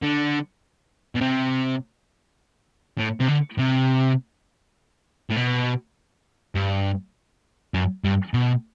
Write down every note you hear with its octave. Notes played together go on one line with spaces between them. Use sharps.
D3
B2
C3
A2
C3
D3
C3
A2
B2
G2
F#2
G2
B2